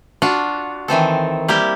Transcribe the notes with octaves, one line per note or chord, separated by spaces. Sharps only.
D4 F4 F#4
D#3 E3 C4 A4
G3 A#3 E4 G4